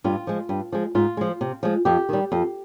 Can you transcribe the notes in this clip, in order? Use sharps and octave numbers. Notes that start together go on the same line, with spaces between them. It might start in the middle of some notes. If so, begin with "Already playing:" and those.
G2 F4
F3 G#3
G2
F3 G#3
G#2 F4
F3 G#3
C3
F3 G#3
F2 G4
D#3 G3
F2